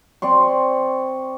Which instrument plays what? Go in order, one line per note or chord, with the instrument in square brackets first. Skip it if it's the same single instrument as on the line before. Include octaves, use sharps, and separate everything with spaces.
[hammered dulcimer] C4 D5 C6 C#6